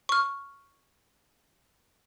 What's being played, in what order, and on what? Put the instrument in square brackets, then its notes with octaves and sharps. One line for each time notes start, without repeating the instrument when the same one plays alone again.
[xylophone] C#6 F6